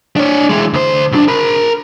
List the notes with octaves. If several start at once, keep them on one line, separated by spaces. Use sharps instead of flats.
D4 C#5
E3 G#3
D2 C5
B1 D4
A#4 B5